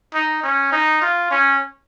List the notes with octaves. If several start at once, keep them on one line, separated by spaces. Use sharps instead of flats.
D#4
C#4
D#4
F4
C#4